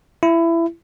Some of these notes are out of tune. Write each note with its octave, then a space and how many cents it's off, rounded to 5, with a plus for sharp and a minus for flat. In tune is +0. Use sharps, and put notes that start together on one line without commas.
E4 +20